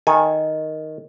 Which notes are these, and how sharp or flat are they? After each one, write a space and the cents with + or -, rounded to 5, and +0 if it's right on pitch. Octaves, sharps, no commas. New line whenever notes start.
D#3 +5 A4 +0 G#5 +0